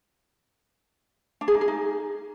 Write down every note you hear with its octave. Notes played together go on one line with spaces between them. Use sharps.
D4
G#4
D#4
G#4
D#4